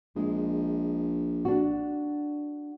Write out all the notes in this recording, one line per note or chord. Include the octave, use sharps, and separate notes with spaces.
A#1 G#3
D4 F#4